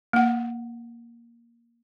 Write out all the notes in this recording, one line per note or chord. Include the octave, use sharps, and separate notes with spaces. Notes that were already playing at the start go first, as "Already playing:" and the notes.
A#3 F#5